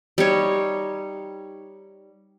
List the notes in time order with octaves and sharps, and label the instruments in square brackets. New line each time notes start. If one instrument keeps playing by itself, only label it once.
[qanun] G3 D#4 C#5